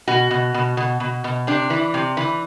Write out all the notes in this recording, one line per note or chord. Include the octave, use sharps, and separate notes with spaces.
B2 F#4
B2
B2
B2
B2
B2
C3 D4
E3
C3
E3